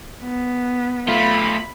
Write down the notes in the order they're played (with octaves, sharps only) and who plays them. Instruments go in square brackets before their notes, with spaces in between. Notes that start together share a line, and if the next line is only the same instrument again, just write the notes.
[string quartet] B3
[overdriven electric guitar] A3 F4 [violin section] B5